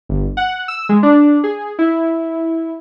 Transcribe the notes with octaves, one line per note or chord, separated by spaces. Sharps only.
G1
F#5
E6
G#3
D4
G#4
E4